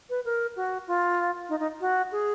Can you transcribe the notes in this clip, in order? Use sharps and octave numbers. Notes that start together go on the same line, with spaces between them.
B4
A#4
F#4
F4
D#4
D#4
F#4
G#4